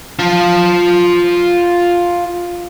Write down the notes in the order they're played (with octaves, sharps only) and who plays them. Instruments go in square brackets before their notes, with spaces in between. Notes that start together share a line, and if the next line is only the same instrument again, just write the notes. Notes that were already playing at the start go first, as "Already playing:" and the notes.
[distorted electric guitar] F4 A5